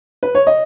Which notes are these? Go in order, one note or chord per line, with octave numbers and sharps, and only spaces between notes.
B4
C#5
D#5